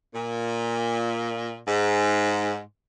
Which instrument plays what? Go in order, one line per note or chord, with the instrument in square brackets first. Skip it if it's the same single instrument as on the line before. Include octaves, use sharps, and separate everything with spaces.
[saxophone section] A#2
G#2